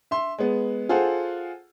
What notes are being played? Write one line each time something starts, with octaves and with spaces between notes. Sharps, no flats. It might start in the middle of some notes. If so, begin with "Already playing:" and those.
E5 C6
G#3 B3
F4 G#4 A4 C5 F#5